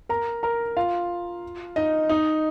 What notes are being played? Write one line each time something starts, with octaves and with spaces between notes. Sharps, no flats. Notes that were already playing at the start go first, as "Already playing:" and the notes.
A#4 A#5
A#4 A#5
F4 F5
D#4 D#5
D#4 D#5